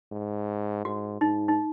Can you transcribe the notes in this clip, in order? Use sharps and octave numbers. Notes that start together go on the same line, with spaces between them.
G#2
G#2 F#4
G#2 D#4
D#4